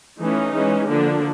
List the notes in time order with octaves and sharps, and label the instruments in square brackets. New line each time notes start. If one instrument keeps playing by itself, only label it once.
[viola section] E3 A3 C#4 D#4
E3 G#3 C#4
D3 F3 A#3 D4